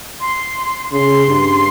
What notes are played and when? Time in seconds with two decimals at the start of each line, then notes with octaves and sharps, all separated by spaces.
0.20 C6
0.92 C#3 C6
1.27 G2